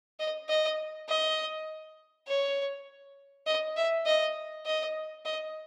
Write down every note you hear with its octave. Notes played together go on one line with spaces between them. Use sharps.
D#5
D#5
D#5
C#5
D#5
E5
D#5
D#5
D#5